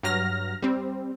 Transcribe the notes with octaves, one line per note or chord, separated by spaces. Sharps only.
G2 F#3 F6 A#6
G3 C4